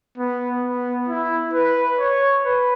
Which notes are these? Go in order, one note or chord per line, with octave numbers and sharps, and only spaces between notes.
B3
B3
E4
B4
C#5
B4